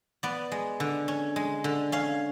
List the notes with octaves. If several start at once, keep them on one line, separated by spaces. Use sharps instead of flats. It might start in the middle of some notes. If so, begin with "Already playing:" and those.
B3 D5
G#3
D3
C#4
G#3
D3
C#4 F5